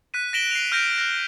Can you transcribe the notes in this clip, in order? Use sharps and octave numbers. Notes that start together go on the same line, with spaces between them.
F#6 B6 D#7
A#6 B6 D7 E7 F#7 G7
C7 F7
F6 G6 A#6 D7
F6 A#6